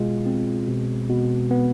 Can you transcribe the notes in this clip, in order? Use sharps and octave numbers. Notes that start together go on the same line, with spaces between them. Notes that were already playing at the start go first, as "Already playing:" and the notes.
Already playing: B2 G#3 F4
C4
B2
B2
B3